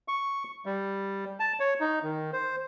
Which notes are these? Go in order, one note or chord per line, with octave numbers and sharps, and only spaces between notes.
C#6
G3
A5
C#5
D#4
D#3
C5